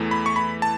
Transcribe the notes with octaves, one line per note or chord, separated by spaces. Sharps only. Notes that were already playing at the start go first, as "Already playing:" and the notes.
Already playing: E2 E3 A3
B5
C#6
B5
A5